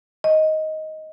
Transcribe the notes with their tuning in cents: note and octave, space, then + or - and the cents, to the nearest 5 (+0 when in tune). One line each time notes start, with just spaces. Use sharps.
D#5 +10